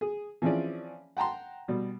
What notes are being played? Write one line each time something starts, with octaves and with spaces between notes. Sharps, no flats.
G#4
E3 F3 C4 C#4 G#4 D5
F#5 G5 A5 A#5 C6
B2 G3